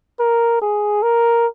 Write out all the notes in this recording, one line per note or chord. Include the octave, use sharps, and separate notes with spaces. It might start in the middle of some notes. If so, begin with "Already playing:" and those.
A#4
G#4
A#4